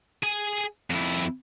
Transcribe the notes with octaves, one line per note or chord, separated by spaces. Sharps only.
G#4 G#5
F2 E4